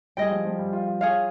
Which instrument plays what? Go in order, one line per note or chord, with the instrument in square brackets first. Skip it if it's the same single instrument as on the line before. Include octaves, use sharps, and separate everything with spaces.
[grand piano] G3 [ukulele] G#4 D#5 G5
[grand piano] F3
F3
G3
F4
F4
[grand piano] F4 [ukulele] G#4 C#5 F5